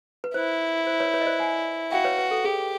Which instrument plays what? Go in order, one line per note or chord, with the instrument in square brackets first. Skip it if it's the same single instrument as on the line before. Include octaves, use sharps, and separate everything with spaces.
[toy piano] B4
[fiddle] E4 [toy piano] C5
[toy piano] C5
B4 C#5
B4 C#5
D#5
C5 D5
F#5 G#5
[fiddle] F#4 [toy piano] F5 G5
[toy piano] B4 C#5
B4
A4
[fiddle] G4 [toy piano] G#4